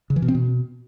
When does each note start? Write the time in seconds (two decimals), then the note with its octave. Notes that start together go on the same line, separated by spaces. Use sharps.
0.10 C#3
0.16 E3
0.22 B2
0.28 C4
0.35 B2